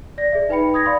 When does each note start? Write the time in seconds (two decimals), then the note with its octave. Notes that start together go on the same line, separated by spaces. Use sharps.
0.18 D5 A#6
0.32 G#4 D5 E5
0.49 D#4 B4 G5 B5 C#7
0.74 D#6 G#6 A#6
0.86 D5 F5 G5 B5 C6